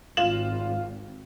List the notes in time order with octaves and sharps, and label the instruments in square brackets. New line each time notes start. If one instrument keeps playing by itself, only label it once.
[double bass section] G#1 [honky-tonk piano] F4 E7 F#7